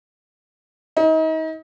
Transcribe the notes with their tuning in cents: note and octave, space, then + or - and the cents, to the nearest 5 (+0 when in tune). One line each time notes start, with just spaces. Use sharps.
D#4 +35